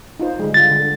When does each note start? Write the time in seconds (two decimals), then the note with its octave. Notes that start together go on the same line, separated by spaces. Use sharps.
0.20 D#4 F4 C5
0.39 D3 G3 G#3
0.54 D3 F4 A6
0.71 D3